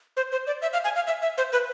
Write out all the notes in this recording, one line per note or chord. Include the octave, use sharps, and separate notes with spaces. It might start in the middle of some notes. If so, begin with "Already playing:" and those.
C5
C5
D5
E5
F5
G#5
F5
E5
E5
C5
B4